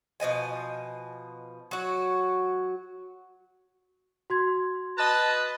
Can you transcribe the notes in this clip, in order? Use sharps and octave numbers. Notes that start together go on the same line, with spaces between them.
B2 F3 D#5 G#5
F#3 F#4
F#4 C6 G#6
B4 D#5 A5